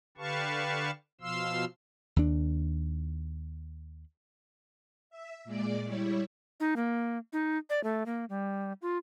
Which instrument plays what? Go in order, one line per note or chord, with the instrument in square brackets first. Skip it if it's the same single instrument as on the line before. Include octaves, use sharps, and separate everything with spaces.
[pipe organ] D3 G4 B4 F5 A5 C#6
B2 F3 F5 C6 E6
[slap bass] D#2 D4
[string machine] E5
A#2 G#3 D5 D6
G3 E4 C#5
[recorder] D#4
A#3
D#4
D5
A3
A#3
G3
F4